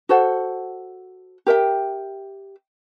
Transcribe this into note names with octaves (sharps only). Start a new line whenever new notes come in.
F#4 A4 C5 F#5
G4 A#4 E5 G5